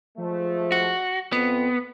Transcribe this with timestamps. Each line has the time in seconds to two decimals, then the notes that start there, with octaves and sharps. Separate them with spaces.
0.18 F3 G#3 A3
0.72 F#4
1.32 F2 B3